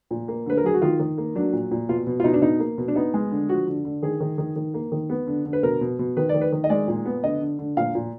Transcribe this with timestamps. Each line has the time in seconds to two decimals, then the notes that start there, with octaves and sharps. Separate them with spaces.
0.11 A#2
0.28 A#3
0.46 D3 B4
0.57 A#4
0.64 F#3 G#4
0.74 F#4
0.82 D#3 F4
1.00 D#3
1.18 A#3
1.35 F#3 D4
1.53 A#2
1.71 A#2
1.89 B2 F4
2.07 B2
2.20 F4
2.24 B2 D#4
2.34 D4
2.42 B2 D#4
2.60 A#3
2.78 B2
2.88 D4
2.95 B3 D#4
3.14 G#3
3.31 D3
3.49 F3 F#4
3.67 D3
3.85 D3
4.03 D#3 G#4
4.20 D#3
4.38 D#3
4.56 D#3
4.74 A#3
4.92 D#3
5.10 B3
5.27 D3
5.45 D3
5.53 B4
5.63 B2 A#4
5.81 B2
5.99 B2
6.17 D#3 B4
6.29 D#3 D5
6.41 B4
6.52 D#3
6.64 D#5
6.70 G#3 D5
6.88 A#2
7.06 B3
7.23 D3 D#5
7.41 D3
7.59 D3
7.77 A#2 F5
7.95 A#2